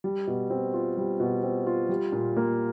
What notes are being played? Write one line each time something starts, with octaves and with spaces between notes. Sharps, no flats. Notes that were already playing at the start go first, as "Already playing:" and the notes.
G3
B2
C4
F4
G3
B2
C4
F4
G3
A#2
A#3